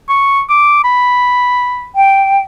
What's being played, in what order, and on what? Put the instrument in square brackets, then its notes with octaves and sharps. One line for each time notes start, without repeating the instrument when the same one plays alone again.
[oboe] C#6
D6
B5
[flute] G5